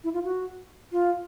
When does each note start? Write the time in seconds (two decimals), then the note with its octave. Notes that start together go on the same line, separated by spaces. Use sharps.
0.04 E4
0.14 F4
0.24 F#4
0.92 F4